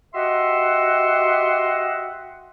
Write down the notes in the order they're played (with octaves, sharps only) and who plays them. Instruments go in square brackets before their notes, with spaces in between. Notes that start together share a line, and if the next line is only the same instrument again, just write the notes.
[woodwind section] F#4 G4 D#5 E5 F#5 C6